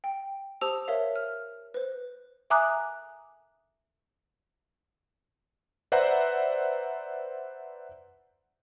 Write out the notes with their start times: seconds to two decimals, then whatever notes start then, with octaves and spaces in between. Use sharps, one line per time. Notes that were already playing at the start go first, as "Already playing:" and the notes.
0.04 G5
0.61 G4 C5 A5 D#6 E6 F7
0.88 A#4 C#5 E5 F5
1.16 F6
1.74 B4 C5
2.50 E5 G#5 A#5 D6 D#6 F#6
5.92 B4 C5 D5 E5 F#5 A#5